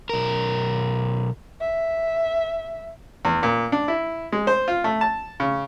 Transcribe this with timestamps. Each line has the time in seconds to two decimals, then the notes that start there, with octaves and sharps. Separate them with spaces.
0.09 B1 A#4
1.61 E5
3.25 E2
3.43 A#2
3.72 D4
3.88 E4
4.32 G#3
4.47 C5
4.68 F4
4.84 A3
5.01 A5
5.40 C#3